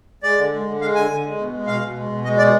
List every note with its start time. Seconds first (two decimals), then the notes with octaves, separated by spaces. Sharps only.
0.23 G#3 D5
0.38 D3
0.53 G#3
0.66 D3
0.81 G#3 F5
0.95 D3 G#5
1.10 D3
1.23 G#3
1.37 B2
1.52 G#3
1.67 B2 F5
1.81 B2
1.96 G#3
2.09 B2
2.24 G#3 D#5
2.38 B2 D5